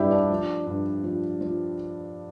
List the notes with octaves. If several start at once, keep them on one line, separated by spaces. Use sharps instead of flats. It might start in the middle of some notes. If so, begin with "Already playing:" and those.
Already playing: G2 G3 E4 G4 B4 D5 E5 G5
D4 D5
F3
G2
F3
F3